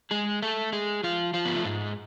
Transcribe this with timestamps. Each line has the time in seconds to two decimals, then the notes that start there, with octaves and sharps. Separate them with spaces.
0.11 G#3 G#4
0.42 A3 A4
0.72 G#3 G#4
1.03 F3 F4
1.34 F3 F4
1.45 B3
1.55 A3
1.65 G#2 G#3